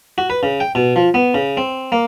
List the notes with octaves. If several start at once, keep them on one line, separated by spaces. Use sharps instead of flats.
F#4
B4
C#3
G5
B2
F3
B3
C#3
C4
A#3